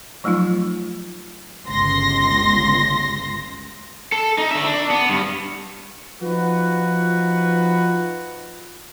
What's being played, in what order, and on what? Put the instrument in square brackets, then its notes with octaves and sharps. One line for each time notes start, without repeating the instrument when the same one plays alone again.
[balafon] F3 F#3 A3 D#4 F4
[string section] G1 C#2 C6 A#6
[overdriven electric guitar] A4
D#4
D3 E5
D4
B3
G2
[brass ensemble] F3 D#4 F4 F#4 B4